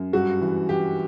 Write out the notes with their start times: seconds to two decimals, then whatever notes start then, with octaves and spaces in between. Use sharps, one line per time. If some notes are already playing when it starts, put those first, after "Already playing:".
Already playing: F#2
0.13 G2 F#4
0.41 E3
0.69 E3 G4